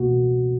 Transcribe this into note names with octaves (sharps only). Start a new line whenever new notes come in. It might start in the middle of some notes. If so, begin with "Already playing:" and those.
Already playing: C#2 B2 A#3 F#4